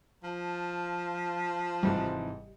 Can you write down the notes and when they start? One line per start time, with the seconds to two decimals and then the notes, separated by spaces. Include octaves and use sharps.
0.24 F3 A5
1.83 G#1 G#2 C3 E3 G3